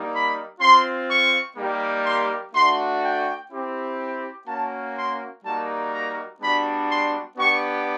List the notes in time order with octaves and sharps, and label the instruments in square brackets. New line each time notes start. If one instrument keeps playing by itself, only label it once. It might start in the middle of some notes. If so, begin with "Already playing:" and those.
Already playing: [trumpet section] G3 A#3 D#4
B5
C4 F4 C6
C#6
G3 A#3 D#4 G4
C6
A3 D4 F#4 C6
G5
C4 E4 G4
A#3 C#4 F#4 A5
C6
G3 A#3 D#4 F#4 A5
A#5
G3 B3 D4 F#4 B5
C6
B3 D4 G4 C#6